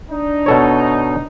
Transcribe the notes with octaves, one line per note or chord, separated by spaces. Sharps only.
D4 D#4
B2 A4 C#5